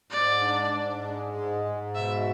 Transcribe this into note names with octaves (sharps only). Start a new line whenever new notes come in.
G#2 D5
D4
G#2
G#3
G#2
G#2
B2 E5